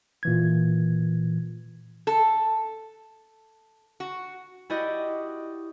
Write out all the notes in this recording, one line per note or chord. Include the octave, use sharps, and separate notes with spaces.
A#2 E3 G#6
A4
F#4
E4 F#4 G4 D5 D#5